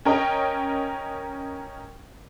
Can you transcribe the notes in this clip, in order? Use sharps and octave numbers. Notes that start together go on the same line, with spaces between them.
C#4 A#4 D#5 G5